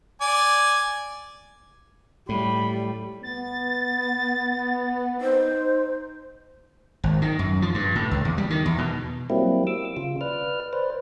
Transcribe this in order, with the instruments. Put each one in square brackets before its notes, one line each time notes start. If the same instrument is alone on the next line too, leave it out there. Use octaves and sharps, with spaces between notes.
[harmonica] D5 G#5
[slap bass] A2 [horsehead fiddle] G3 [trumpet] B5
[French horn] B3 [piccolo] A6
[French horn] D#4 [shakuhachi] C5
[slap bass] G#1
D#3
F#2
F3
G2
A2
C#2
E2
G3
D#3
E2
B2
[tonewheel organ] F#3 G3 A#3 C4 E4
D6 E6
C#3 F4
B4 D5 F6
B4 C5 D5